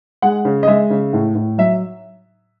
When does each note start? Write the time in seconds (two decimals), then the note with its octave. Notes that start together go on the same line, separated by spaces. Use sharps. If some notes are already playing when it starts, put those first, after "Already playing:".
0.22 G#3 F#5
0.45 C#3
0.63 D#5
0.67 G#3 E5
0.90 C#3
1.13 A2
1.35 A2
1.58 F#3 E5